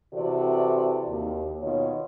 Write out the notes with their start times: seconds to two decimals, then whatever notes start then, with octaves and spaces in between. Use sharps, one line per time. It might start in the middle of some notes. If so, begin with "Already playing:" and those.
0.12 C3 E3 C4 F#4 A4 D5
1.07 D#2
1.60 B2 D#3 F4 C#5